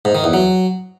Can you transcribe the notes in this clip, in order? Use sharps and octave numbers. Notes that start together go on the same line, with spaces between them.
G#2
D#3
E2
F#3